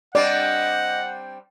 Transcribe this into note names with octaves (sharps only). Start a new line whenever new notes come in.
G3 C4 D4 D5 D#5 F#5